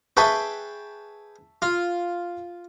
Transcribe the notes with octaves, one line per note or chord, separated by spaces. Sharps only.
G#4 B4 E5 G5 A5 C#6
F4